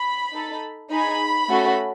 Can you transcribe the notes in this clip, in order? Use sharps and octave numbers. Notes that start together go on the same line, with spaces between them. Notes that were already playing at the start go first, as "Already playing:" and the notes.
Already playing: B5
D#4 A4
D#4 G#4 B5
A3 C#4 F#4 A4